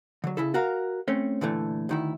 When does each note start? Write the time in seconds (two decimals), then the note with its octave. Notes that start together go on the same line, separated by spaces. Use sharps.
0.24 D3 F#3
0.37 C#3 E4 A4
0.54 F#4 A#4 F5
1.08 A3 C4 C#4
1.41 A#2 D3 E3 A3
1.89 D2 D#3 E4